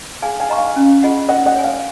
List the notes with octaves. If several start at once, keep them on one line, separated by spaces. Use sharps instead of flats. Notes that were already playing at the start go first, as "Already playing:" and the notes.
G#4 F5 G#5
F5 G#5
D#5 A#5 C#6
F5 G#5
C#4
F4 G#4 D#5 F#5
A#4 D#5 F#5
D#5 F#5
C#5 G#5
F5